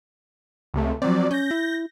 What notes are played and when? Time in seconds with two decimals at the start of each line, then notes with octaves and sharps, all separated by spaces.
0.74 C#2 C3 A3
1.02 F3 F#3 C4 D5
1.31 C#4 G6 A#6
1.51 E4